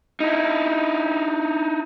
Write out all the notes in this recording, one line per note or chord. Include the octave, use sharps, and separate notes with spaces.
D#4 E4